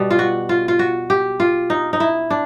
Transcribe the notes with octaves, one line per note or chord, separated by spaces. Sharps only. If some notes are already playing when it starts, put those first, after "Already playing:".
Already playing: B2 G3
F4
F#4
F4
F4
F#4
G4
F4
D#4
D#4
E4
D4